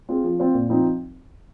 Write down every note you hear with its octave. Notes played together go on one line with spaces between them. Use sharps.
C4 F4 G#4
F3
C4 F4 C5
A#2
F3 C4 D#4